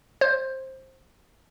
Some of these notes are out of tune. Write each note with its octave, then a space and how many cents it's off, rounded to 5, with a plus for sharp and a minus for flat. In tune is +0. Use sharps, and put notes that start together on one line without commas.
C5 +15